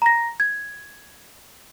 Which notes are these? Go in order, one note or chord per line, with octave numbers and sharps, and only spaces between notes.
A#5 A#6
G#6